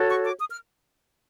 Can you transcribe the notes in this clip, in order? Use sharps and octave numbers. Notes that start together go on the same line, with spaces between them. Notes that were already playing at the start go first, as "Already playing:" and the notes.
Already playing: F#4 A4 C#5
C#6
D6
D#6
F6